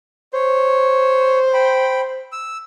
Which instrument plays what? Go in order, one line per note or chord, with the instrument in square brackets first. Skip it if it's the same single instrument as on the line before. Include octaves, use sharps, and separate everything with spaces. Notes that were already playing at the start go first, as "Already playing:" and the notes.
[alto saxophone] C5 [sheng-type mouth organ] C#5
[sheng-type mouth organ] G5 B5
E6